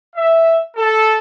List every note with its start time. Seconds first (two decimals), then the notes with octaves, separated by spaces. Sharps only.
0.16 E5
0.77 A4